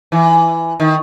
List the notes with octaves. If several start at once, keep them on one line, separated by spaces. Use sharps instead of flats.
E3
D#3